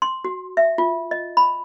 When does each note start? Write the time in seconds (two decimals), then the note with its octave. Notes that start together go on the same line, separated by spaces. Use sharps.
0.02 C6
0.25 F#4
0.57 E5
0.78 F4
1.11 D#5
1.37 B5